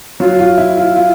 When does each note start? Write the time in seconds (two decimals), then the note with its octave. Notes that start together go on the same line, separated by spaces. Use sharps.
0.20 F#3 F4 F#4
0.39 F4
0.58 E4
0.77 E4 F4
0.96 F4